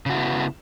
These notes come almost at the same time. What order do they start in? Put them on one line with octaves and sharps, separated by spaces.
C#3 F#4 E4 B3